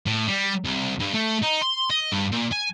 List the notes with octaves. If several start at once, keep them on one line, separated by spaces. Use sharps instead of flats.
A2
G3
C2
G2
A3
D#4
C6
D#5
G2
A#2
G#5